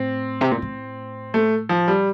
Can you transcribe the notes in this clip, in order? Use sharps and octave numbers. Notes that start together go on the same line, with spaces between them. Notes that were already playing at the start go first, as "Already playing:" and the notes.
Already playing: A2 C4
C3
A#2
A2
A3
F3
G3